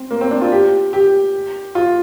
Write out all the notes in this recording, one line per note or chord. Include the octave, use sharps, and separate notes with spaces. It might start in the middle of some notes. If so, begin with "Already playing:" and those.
Already playing: C4
A#3
C4
D4
F4
G4
G4
F4